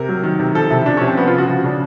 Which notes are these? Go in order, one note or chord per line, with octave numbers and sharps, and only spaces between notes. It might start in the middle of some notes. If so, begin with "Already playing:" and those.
Already playing: C3 A#4
F#3
D#3
C3
F3 A4
C3 E4
F3 D4
C3 C#4
C4
F3 B3
F4
C#3 F#4
F3 F#4
C#3 D4